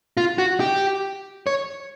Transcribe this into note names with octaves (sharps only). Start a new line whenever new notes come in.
F4
F#4
G4
C#5